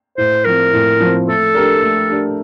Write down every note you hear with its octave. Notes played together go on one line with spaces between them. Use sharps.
A2 C5
F3 C4 A#4
A2
F3 C4
A3 A4
D4 G4 A#4
A3
D4 G4 A#4